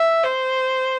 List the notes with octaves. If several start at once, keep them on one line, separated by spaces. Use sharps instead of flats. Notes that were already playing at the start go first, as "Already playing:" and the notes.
Already playing: E5
C5